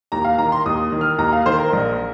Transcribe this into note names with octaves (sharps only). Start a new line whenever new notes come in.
D#2 A#5
F5
D#3 A#5
C6
D#2 D#6
D#3
F6
D#2 A#5
F5
D#3 C5
A#4
A#1